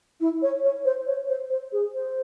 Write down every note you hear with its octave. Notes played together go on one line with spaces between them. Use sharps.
E4
C#5
C#5
C5
C#5
C5
C5
G#4
C5